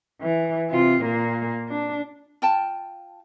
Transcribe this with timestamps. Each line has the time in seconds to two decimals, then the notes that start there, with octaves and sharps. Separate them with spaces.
0.22 E3
0.71 C3 F4
1.03 A#2 A#3
1.69 D4
2.42 F4 G5 A5